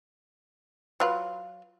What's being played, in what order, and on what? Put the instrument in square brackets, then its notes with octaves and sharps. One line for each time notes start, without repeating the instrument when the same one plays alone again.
[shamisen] F#3 F4 B4